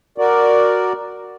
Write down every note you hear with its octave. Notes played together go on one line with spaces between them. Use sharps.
F#4 A#4 D5